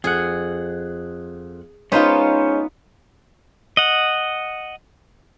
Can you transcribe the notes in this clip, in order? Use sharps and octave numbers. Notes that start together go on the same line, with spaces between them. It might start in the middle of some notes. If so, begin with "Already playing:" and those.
F2 G#4 F#5
G#3 B3 C#4 D#4 F4 C5
D#5 F#5